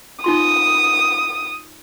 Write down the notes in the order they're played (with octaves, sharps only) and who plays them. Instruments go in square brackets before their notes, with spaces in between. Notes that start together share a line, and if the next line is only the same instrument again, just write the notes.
[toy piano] D#4 F4 C6 [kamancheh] D#6